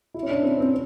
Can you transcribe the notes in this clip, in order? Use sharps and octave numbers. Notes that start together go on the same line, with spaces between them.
E4
C#4
D4
C4
C4